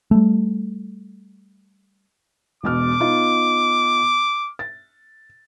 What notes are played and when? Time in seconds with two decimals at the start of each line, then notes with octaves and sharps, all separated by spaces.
0.11 G3 A3
2.63 E1 B2 D6 F6
3.00 B3 D#4 F4
4.59 A6